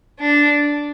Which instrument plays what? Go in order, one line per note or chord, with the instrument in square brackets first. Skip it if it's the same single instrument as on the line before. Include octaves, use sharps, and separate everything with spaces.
[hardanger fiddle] D4